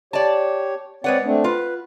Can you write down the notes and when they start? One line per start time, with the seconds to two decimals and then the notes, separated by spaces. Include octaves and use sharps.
0.13 G4 C#5 D5 A5
1.04 G#3 C4 B4 C#5 D5 F#5
1.25 A3 C4 D4
1.44 F4 B4